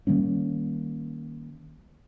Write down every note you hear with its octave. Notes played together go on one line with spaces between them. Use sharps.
D#3 G3 A#3 C#4